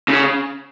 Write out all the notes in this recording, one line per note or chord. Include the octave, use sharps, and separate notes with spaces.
C#3